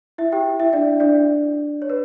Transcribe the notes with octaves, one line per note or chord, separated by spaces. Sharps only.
E4 E5
G4 G5
E4 E5
D4 D5
D4 D5
C#5
B4